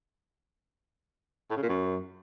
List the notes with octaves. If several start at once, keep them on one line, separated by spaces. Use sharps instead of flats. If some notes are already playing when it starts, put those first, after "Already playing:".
A2
C#3
A#2
F#2